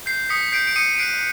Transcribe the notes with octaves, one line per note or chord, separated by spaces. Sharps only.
G6 C7
D#6 B6 C#7
G6 C7 D7
D7
D#6 C#7 D#7
D#7
F#6 C7 D7